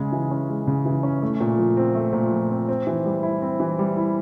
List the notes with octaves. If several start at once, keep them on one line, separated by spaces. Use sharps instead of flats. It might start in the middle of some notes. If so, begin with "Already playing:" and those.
Already playing: C#3 G#3
E3
C#4
G#3
C#3
E3
C#4
A3
A#2
F3
C4
A3
A#2
F3
C4
C4
E3
G3
E4
C4
E3
G3
E4